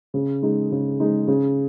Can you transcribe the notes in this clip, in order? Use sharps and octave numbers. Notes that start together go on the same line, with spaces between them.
C#3
G#3 D#4
C#3
G#3 D#4
C#3